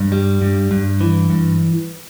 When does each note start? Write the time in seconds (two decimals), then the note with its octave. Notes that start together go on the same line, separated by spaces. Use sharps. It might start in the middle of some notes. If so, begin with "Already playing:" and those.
Already playing: G2
0.12 G3
0.42 G2
0.71 G2
1.01 E3
1.30 G2